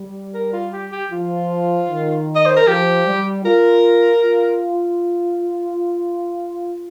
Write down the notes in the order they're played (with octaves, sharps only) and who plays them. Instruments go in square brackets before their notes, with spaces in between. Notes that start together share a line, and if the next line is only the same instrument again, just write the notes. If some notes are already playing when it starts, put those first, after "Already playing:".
Already playing: [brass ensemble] G3
[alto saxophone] A#4
F4
G4
G4
[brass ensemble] F3 [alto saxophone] F4
[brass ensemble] D#3
[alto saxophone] D#5
C5
A#4
[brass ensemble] F3 [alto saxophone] G4
[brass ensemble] G3
[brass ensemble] F4 [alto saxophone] A#4
[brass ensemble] F4